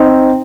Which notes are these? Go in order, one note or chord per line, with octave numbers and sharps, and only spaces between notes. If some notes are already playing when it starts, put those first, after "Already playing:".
Already playing: C4 D#4